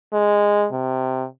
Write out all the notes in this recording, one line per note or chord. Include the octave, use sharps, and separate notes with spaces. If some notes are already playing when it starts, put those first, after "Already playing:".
G#3
C3